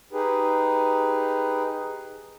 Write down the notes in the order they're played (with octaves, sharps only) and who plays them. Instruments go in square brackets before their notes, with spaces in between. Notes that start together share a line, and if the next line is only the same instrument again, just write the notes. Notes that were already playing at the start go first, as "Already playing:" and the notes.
[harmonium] D#4 G4 G#4 B4